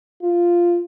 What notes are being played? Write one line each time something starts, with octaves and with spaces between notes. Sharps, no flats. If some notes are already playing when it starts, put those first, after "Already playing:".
F4